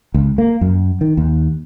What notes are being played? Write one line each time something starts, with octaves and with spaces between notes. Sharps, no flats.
C#2
A#3
F#2
D#3
D#2